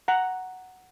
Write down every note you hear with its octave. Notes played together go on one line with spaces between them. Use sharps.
F#5 A#5